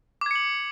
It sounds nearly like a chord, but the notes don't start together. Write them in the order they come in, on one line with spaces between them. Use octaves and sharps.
D6 G#6 C#7 F#7